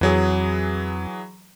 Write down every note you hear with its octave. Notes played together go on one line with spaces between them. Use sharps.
F2 E3 F#3 G#4